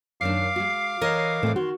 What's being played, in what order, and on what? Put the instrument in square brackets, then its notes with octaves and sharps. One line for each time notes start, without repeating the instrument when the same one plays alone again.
[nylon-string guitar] F#2 D#3 D4 [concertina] F5 D6 [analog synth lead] C7
[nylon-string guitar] G#3 F#4
[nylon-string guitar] E3 [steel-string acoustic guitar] A#4 C#5 D#5
[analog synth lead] A2 [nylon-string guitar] E3 C4
[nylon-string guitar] D#3 [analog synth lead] F#4 [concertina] C6